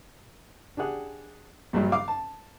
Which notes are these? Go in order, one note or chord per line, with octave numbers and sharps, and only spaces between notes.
D4 G4 G#4 F#5
A#1 G2 F#3
F5 D6
A5